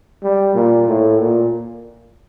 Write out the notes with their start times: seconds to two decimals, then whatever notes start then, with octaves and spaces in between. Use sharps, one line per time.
0.23 G3
0.55 A#2
0.88 A2
1.20 A#2